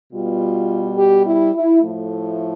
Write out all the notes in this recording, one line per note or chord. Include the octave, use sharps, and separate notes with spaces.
B2 G3 B3 F4
G4
E4
E4
A2 F3 A3